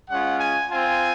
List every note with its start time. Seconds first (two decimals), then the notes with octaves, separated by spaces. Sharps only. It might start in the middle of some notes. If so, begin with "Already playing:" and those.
0.10 G#3 C#4 F4 F#5
0.40 G#5
0.69 C4 F4 G#5